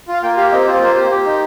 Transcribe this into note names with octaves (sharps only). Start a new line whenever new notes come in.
F4 F5
A#3 G5
G4 F5
C4 D#5
F4 C5
A#3 C5
G4
G4
D#4